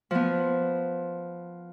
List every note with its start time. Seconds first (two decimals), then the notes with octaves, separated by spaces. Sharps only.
0.11 F3 B3